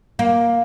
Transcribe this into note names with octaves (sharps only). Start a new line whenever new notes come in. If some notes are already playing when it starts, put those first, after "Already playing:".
A#3